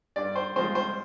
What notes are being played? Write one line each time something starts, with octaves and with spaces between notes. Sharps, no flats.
G2 D5
C5
F3 G#3 C4 C5
C5